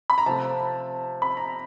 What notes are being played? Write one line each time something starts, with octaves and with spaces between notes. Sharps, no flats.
B5
A#5
C3 F3 A3 A5
B5
A#5